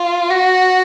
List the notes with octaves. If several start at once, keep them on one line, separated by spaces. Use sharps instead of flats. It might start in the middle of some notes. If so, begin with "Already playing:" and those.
Already playing: F4
F#4